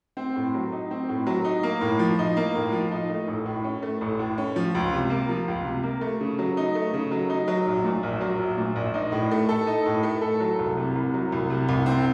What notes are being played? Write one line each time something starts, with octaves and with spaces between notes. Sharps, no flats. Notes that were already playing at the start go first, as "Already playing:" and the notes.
C4
A2
F#3
D#4
C4
A2
F#3
D#4
A#3
A2
F3
D#4
A#3
A2
F3
D#4
A3
A1
A2
C#4
A3
A1
A2
C#4
F3
C#2
C3
A#3
F3
C#2
C3
A#3
A3
C#3
F#3
D#4
A3
C#3
F#3
D#4
F#3
A#1
A#2
A#1
F#3
A#1
A#2
A#1
D#4
A2
A3
A4
D#4
A2
A3
A4
F#3
C2
C3
C2
F#3
C2
C3
C2
C4